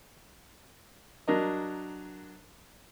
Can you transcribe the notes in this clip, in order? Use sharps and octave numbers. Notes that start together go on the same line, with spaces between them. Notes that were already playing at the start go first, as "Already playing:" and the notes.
F#3 D4 A#4 D#5